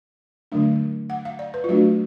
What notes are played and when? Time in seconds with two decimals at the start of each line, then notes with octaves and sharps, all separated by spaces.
0.52 D3 F#3 A3 D4
1.10 F#5
1.25 F5
1.39 D5
1.54 B4
1.64 F4
1.69 F#3 A3 D4 F#4